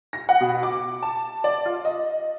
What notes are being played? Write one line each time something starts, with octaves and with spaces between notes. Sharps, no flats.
A#6
F#5
B2
D6
A5
D5
F4
D#5